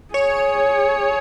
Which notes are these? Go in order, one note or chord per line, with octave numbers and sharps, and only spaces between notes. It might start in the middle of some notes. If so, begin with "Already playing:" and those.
G#4 C#5